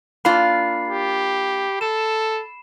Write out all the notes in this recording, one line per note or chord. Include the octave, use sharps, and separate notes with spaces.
A#3 D4 F4 B5 C7
G4
A4 E7